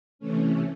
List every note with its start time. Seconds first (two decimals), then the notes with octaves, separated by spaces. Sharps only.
0.19 C3 E3 A3 C#4